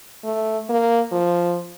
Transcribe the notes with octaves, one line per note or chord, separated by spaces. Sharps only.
A3
A#3
F3